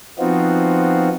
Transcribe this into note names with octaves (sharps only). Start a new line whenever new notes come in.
F3 B3 C4 D#4 F4 F#4